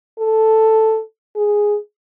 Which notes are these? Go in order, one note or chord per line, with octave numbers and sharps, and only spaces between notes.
A4
G#4